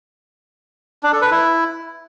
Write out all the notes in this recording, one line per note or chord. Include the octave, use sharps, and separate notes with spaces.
D4
A4
B4
E4